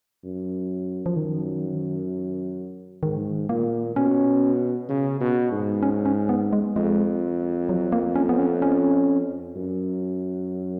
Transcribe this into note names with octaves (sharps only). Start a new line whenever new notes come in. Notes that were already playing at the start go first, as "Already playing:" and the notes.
F#2
F3
F#2 D#3
G#2 D#3
A#2 A#3
B2 C#4
C#3
B2
G#2
C#4
C#4
B3
G#3
F2 G#3
F#3
A#3
C#4
B3
C#4
C#4
F#2